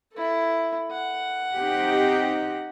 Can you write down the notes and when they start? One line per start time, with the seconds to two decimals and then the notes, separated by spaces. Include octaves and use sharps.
0.13 E4 A4
0.91 F#5
1.57 C4 D#4 G4